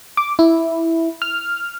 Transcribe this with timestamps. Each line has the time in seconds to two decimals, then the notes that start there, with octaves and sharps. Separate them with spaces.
0.17 D6
0.39 E4
1.22 F6